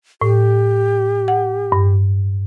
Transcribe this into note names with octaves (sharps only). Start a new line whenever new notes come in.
A2 G4
F#5
G2